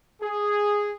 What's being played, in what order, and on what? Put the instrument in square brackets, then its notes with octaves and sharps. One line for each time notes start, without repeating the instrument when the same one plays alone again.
[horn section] G#4